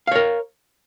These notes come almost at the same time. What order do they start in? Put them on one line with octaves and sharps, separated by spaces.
F5 C#5 A#4